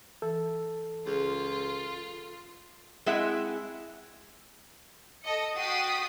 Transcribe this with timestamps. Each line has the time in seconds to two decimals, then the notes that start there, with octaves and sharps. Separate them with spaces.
0.22 E3 A4
1.07 C#2 F4 G#4
3.06 G#3 C4 E4 G#4 E5 F#5
5.23 A4 D#5 C#7
5.55 F#4 G5 D#6 A6 B6 C7